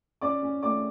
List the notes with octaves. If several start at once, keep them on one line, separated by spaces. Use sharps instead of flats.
C#4 D5 D6
C#4
A3 D5 D6